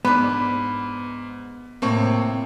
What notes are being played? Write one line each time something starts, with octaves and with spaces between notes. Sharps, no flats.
G#2 B3 D4 B4
A2 C3 A#3 C4 C#6